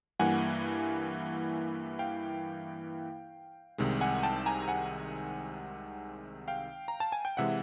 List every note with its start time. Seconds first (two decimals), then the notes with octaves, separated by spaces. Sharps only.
0.19 G2 E3 G3 A#3 F#5 G#5
1.99 F5 G5
3.78 C2 C3 D#3 G#3
4.01 F#5 G#5
4.23 G5 A5
4.46 G#5 A#5
4.68 F#5 G#5
6.48 F5 G5
6.88 A#5
7.00 A5
7.12 G#5
7.25 G5
7.37 C3 E3 G#3 E5 F#5